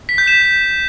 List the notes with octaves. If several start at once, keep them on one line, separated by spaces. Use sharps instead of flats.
B6
G6
E7